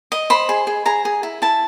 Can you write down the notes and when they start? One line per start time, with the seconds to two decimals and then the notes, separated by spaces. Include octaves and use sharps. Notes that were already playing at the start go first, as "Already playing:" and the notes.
0.12 D#5
0.30 C5 B5
0.49 G#4
0.67 G#4
0.86 G#4 A#5
1.05 G#4
1.23 E4
1.42 E4 A5